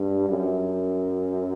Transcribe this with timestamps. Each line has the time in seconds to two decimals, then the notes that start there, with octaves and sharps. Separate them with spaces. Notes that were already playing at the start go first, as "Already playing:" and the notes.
Already playing: G2
0.29 F#2